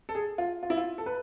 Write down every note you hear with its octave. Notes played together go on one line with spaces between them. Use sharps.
A4
G#4
F4
F4
E4
F4
A4
B4